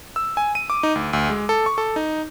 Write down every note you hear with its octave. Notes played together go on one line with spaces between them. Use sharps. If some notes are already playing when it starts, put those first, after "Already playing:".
E6
G#5
D#7
D6
D#4
D2
D2
G#3
A4
C#6
A4
D#4